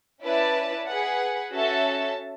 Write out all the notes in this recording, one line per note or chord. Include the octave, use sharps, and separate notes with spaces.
C#4 E4 B4 D5 A5
G#4 B4 F#5
C#4 F#4 A4 E5 A5